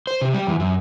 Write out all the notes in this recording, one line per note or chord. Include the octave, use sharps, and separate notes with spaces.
C5
C3
G3
E2
F#2